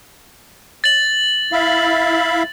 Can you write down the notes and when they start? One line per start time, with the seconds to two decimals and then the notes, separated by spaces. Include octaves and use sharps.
0.84 A6 F#7
1.52 E4 E5 F5